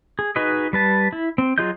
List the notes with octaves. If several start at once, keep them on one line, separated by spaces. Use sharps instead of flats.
G#4
D#4 F#4 G#4 B4 D#5
G3 B4 A5
E4
C4
F#3 F4 G#4 D#5 G6